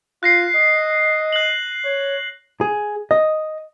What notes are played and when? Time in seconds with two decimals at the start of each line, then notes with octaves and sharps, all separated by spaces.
0.23 F4 F#6 A#6 C7
0.56 D#5
1.33 F#6 F#7
1.85 C#5
2.61 G#4
3.11 D#5